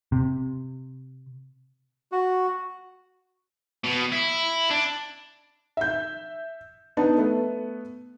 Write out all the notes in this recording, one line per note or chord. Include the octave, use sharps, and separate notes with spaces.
C3
F#4
B2
E4
D4
E5 G6
B3 D4 D#4 A5
A3 B3